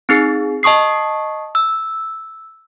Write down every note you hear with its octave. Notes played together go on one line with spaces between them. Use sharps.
C4 D#4 G#4
D#5 A5 C#6 D#6 C7
E6